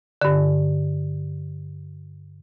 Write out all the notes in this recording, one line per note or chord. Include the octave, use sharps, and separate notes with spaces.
G2 D3